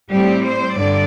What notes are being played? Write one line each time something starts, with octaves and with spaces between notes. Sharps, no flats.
A2 G3 C4 G4
C5
G2 D3 D5